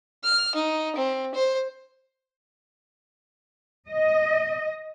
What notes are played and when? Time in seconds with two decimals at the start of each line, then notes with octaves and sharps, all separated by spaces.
0.24 F6
0.55 D#4
0.96 C4
1.35 C5
3.90 D#5